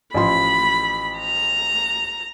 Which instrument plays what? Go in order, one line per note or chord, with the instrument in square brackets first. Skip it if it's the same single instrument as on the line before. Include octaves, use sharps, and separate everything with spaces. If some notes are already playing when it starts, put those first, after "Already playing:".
[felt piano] A1 F3 C6 [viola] B5
[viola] A#5